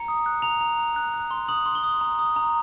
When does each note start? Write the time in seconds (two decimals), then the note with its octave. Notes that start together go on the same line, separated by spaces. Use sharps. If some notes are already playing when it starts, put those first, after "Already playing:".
Already playing: A#5 C#7
0.08 D#6
0.26 F#6
0.42 A#5 F7
0.61 A#5
0.78 A#5
0.96 F#6
1.14 F#6
1.31 C6
1.49 D#6 F#7
1.66 C6
1.75 G7
1.83 D#6
2.01 A#5
2.19 D#6
2.36 A#5